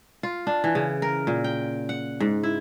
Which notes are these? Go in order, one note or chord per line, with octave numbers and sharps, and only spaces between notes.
F4
D4
E3
C#3
A#4
A#2
G5
F#5
G#2
E4